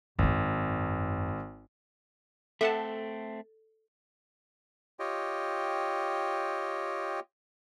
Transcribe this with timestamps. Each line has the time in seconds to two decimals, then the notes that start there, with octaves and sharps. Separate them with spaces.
0.19 G#1 F#2 C4
2.61 A3 C4 A4 E5 F#5 A5
4.99 F4 G4 C#5 D#5 G5